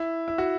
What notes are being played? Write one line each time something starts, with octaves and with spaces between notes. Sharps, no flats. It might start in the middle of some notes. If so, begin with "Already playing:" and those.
Already playing: E4
E4
F#4